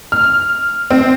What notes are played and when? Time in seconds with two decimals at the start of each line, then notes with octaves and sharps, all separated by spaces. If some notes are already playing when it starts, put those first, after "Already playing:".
0.12 F6
0.91 C4